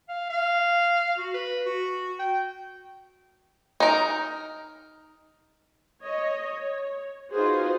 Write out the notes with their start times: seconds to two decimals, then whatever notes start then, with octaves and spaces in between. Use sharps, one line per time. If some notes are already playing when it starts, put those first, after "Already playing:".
0.09 F5
0.30 F5
1.18 F#4
1.34 B4
1.66 F#4
2.20 G5
3.80 D#4 A#4
6.03 C#5 D#5
6.44 C#5
7.31 D#4 F4 F#4 G#4 B4 C5